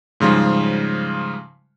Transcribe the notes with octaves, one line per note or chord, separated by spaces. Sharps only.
G#2 C#3 F3 G3